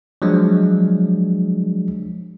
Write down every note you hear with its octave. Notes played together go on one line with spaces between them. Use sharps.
F3 F#3 G#3 D4